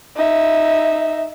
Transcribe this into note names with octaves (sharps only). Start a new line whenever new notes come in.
D#4 E5